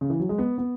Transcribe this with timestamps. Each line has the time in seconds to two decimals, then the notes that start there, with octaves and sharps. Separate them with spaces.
0.01 C#3
0.10 E3
0.20 F#3
0.29 G#3
0.38 B3
0.58 B3